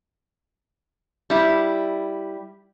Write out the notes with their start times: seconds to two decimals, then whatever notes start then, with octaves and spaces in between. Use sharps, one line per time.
1.30 G3 E4